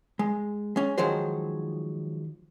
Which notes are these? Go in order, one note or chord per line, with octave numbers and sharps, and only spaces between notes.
G#3
G#3 C#4
D#3 F3 F#3 G#3 C5